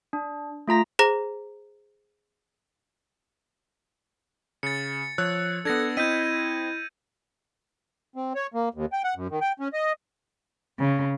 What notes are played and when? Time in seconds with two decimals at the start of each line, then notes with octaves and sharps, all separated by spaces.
0.13 D4
0.68 A3 F4 A#5 A#6
0.99 G#4 C5 A#5 A#6
4.63 C#3 A6 C#7
5.18 F3 C#5 E6 F#6
5.65 B3 D4 A4 G#6 A#6
5.97 C4 E4 D#5 G6 B6 D#7
8.16 C4
8.35 C#5
8.54 A#3
8.74 D#2
8.93 G5
9.04 F#5
9.16 F#2
9.30 D#3
9.41 G5
9.60 C#4
9.73 D#5
10.79 C#3